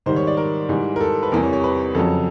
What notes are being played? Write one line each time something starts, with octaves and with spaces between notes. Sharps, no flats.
G#2 D#3 G3 C5
C#5
D5
A#4
G#2 E3 G3
A#4
A4
B4
E2 C3 E3 G3 A#4
C#5
C#5
B4
F2 C#3 F#3 A4